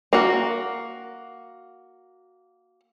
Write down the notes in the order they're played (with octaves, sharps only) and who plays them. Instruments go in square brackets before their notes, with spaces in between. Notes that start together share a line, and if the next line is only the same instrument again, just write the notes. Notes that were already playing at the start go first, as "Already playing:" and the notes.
[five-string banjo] A#3 F#4